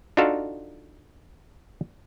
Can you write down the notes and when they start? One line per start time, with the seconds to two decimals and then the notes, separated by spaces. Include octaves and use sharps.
0.17 D4 D#4 F4 F#4 A4 F5